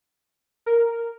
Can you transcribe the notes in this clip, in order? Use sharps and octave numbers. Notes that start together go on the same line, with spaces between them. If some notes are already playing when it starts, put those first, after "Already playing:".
A#4